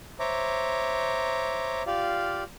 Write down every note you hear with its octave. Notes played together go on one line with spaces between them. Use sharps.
C5 C#5 E5 A#5 D6
F4 G4 D5 F5